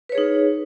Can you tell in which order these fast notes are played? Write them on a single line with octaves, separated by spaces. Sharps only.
B4 C#5 G#4 D#4